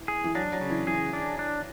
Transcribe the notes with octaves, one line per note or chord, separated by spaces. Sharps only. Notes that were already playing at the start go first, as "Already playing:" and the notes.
Already playing: E3
G#4
E3
F#3 D4
F#3
C#3
E3
E3 G#4
D4
D4